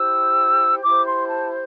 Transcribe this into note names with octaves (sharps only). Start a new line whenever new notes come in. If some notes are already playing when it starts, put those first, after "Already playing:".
Already playing: E4 G4 C5 E6
E4 G4 C5 D6
C6
A5